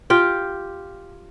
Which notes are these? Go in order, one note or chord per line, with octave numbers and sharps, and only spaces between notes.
F4 G4 G5